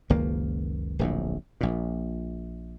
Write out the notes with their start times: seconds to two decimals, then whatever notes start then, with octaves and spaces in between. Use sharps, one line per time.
0.10 F#1 C#2 D#3 A#3
0.99 D1 A#1 A2
1.61 A#1 A#2